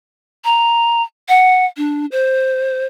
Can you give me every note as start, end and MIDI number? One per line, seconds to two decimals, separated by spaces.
0.45 1.02 82
1.29 1.66 78
1.77 2.06 62
2.12 2.86 72